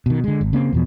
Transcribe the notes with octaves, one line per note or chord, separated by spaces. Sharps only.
B2 D#3
D3 G#3
G#1
C#3 A#3 C4
E2 B2 F3